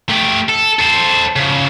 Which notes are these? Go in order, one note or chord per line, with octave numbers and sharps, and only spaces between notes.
A3 G4
A4
A4 C5
C#3 F3